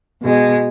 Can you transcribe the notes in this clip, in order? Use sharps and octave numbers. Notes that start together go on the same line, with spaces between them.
B2 G#3